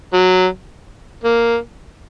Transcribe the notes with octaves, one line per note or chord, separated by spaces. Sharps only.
F#3
A#3